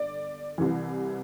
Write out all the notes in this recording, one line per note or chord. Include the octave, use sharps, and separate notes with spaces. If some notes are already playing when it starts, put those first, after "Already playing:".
Already playing: G1 D3 D5
C2 C3 E3